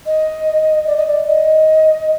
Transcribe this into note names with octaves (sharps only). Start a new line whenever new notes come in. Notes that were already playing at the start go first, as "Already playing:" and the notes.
D#5
D5
D#5
D5
D#5